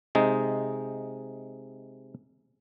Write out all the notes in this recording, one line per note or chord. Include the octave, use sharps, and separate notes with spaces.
C3 G#3 D#4